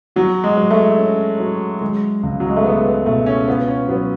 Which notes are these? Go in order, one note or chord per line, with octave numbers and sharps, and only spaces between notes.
F#3 F#4
G#3
F#3
A3
C#4
F#3
G#3
C#2
F#3
G#3
A3
G#3 B3
B3
B2 A3
C#4
B3 F4
C#4
F#3 B3